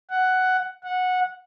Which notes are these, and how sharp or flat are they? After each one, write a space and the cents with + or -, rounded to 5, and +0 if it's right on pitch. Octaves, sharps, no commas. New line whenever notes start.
F#5 +5
F#5 -15